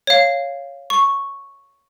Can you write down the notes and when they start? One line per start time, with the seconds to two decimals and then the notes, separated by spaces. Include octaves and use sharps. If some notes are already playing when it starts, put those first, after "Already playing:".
0.07 C#5 F5
0.90 C#6